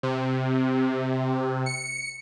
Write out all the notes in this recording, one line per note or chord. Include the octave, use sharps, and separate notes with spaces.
C3
C#7